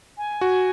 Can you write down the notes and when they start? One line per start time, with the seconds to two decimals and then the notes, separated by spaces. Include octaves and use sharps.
0.17 G#5
0.41 F#4